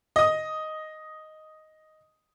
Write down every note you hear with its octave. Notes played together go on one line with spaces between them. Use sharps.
D#5 D#6